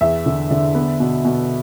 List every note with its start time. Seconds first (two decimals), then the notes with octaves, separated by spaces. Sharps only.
0.01 E2 E5
0.26 D3
0.51 D3
0.75 B3
1.00 B2
1.25 B2